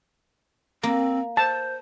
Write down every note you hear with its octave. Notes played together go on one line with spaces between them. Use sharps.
A#3 C4
C5 A5